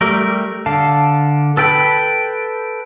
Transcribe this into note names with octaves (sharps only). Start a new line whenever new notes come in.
G3 A3 A#4
D3 F5 A5
A4 B4 G5 A5 B5